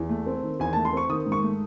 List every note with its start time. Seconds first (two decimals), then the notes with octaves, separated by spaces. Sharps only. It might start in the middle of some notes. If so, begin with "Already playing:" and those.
Already playing: E2
0.09 A3
0.26 C4
0.43 D#3
0.60 E2 G#5
0.73 A3 A5
0.85 C6
0.93 C4 C#6
1.09 D#3 D#6
1.26 G#2
1.32 C#6
1.43 A3